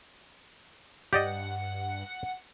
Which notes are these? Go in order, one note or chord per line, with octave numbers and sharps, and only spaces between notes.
G2 G4 D5 D#5 F#5